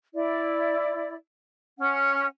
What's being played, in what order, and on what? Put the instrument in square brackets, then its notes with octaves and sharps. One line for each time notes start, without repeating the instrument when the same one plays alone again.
[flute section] E4 D5
C#4 F#5